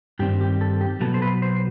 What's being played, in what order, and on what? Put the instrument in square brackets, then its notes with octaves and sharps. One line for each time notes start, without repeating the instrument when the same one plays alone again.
[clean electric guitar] G2 D#3 G3 C4 G4
G4
A4
G4
B2 F#3 B3 A4
C5
B4
C5